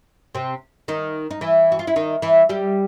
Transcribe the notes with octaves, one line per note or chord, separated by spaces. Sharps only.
C3 C4
D#3 D#4
D#4
E3 E4
F#4
F4
E4
D#3 D#4
E3 E4
G3 G4